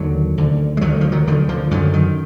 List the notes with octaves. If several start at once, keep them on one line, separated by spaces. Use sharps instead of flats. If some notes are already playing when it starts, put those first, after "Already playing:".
Already playing: D#2 D3 D#3 F#3
D2 D3
G#3
D2 D3 D#3 F#3
F3
D#3 F#3
D2 D3 D#3
D3 F3
F#2 D3 D#3 F#3
D#3